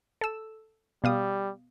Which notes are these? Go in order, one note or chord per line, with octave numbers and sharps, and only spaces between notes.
A4 E6
B2 G3 F5 D#6